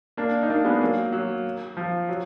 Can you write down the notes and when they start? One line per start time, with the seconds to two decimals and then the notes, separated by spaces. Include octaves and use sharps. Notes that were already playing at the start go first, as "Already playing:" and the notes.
0.17 A#3 D4
0.43 D#4
0.50 A#3 D4
0.65 G#3 B3
0.82 F#3 A#3
1.12 F#3
1.77 F3
2.09 F#3